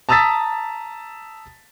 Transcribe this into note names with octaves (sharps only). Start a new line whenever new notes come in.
A5 A#5 D#6 E6 A6 B6